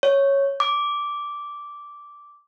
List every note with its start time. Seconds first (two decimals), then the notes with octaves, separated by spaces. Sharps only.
0.03 C#5
0.60 D6